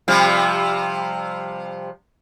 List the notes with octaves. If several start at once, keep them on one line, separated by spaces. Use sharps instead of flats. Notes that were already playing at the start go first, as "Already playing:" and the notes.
C3 F3 G3